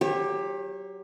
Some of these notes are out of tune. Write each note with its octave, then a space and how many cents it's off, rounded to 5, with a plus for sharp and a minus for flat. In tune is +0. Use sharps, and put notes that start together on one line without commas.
F#3 +25 G4 +15 C#5 -35